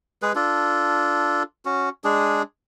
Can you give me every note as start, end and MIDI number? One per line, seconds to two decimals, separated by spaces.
0.22 0.32 56
0.22 0.32 68
0.22 0.32 71
0.35 1.43 62
0.35 1.43 65
0.35 1.43 69
1.65 1.89 61
1.65 1.89 66
2.04 2.42 56
2.04 2.42 62
2.04 2.42 68